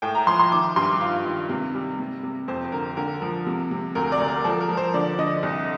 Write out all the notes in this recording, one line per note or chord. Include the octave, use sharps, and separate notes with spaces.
A2 G5
A#5
F3 C6
C6
D#3 D6
G2 C6
F4 F5
D#3
C3
G3
C3
C3
F2 C5
D3 A#4
D3 A#4
F3
C3
C3
D2 A#4
D5
D2
A#4
F3 A4
A#4
F3
C5
D3 D5
D3 D#5
C2